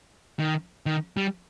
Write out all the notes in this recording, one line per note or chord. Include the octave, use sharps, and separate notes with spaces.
D#3
D#3
G3